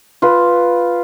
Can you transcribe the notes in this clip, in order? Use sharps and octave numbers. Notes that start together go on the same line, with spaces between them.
F4 B4